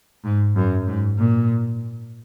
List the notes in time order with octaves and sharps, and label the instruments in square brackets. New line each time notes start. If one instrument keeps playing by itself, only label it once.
[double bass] G#2
F#2
G#2
A#2